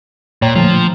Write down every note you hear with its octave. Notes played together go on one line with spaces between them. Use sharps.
A#2 C#5 G5 A#5
D3 F3 A3